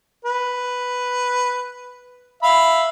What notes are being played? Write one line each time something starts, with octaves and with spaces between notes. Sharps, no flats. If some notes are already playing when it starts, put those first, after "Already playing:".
B4
E5 F5 B5